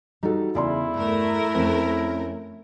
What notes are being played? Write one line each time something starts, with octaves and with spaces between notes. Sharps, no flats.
G3 D#4 F#4 G4 A4
E2 C#3 E4 D5 C6
G2 A3 A#4
F2 C4 C#4